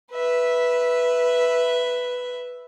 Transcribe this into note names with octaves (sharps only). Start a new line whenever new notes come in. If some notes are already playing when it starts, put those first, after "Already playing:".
B4 E5